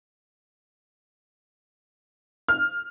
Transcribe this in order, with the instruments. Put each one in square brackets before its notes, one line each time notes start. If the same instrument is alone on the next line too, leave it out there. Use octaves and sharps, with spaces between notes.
[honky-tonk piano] F6